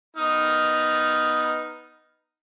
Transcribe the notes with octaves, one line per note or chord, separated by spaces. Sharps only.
B3 D#4 F6